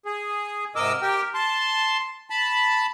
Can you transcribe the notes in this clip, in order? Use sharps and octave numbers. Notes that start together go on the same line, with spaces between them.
G#4
G#2 C3 A#4 D#5 D6 E6
G4 A#4 G5
A5 C6
A5 B5